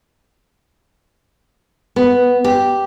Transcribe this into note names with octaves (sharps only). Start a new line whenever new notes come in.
B3
G4